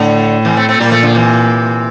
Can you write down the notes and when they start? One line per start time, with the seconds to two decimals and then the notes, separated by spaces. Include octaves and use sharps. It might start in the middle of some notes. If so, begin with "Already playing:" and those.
Already playing: A2 D3
0.45 C3 E3
0.57 A3 C4
0.69 A3 C4
0.79 A#2 G3 A#3
0.91 F3 A3
1.02 D3 F3
1.15 C3 E3